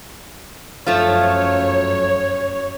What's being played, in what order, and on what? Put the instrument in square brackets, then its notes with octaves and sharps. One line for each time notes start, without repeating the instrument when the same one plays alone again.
[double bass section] F#2 [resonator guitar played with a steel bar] F3 A3 F4 [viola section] C#5